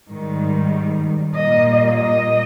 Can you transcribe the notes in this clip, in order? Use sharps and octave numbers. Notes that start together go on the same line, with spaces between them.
G#2 D#3 G3
A#2 G3 A#3 D#5
D#5